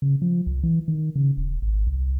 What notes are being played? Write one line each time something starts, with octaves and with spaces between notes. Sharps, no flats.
C#3
F3
C2
E3
D#3
C#3
D#1
G#1
C2